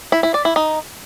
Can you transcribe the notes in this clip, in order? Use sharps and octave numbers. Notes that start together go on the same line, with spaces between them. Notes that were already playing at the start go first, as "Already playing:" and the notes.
E4
E4
D5
E4
D#4